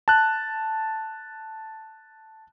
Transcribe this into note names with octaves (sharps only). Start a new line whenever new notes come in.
A5 F#6